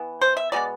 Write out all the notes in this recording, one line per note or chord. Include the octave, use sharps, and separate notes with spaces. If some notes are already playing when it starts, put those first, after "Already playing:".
Already playing: E3 B3
C5
E5
B2 G#3 B3 D5